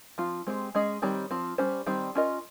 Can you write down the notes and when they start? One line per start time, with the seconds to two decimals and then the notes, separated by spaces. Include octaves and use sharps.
0.18 F3 C4 F4
0.47 G#3 C4 G4
0.75 G#3 C#4 G#4 D#5
1.02 D#3 G3 C4 G4 C#5
1.31 F3 C4 F4
1.58 G3 C#4 G4 C5
1.87 D#3 G3 C4 G4
2.15 C#4 F4 A#4 D#5